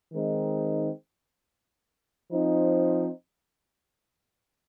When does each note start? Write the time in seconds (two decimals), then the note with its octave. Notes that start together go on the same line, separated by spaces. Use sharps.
0.13 D#3 G#3 C4 D#4
2.32 F3 C4 D#4